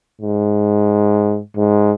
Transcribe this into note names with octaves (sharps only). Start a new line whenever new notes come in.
G#2
G#2